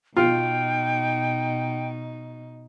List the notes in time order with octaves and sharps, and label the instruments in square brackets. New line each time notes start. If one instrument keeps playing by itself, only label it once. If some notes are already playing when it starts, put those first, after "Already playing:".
[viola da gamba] B2 D#4 [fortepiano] F4 [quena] G5